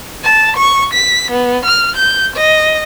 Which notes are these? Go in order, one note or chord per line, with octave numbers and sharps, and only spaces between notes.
A5
C#6
B6
B3
F6
G6
D#5